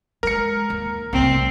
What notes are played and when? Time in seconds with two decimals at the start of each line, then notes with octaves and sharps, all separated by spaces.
0.23 G#3 A#4 C#7
0.70 D#2
1.13 C2 A3 C4